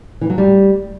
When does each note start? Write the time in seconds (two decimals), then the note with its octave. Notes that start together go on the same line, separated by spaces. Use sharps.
0.21 E3
0.30 F#3
0.38 G3